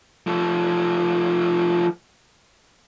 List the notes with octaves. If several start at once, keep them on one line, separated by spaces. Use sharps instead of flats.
F3 A3